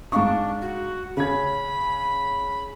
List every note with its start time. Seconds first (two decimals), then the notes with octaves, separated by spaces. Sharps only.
0.12 G#2 D4 F5 C#6
0.62 F#4
1.17 C#3 C#4 B5 G#6